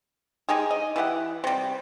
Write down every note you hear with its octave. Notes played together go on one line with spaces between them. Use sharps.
G#3 D#4 G4 G#4
D#5
E3 E4 G4 F#5
C3 G3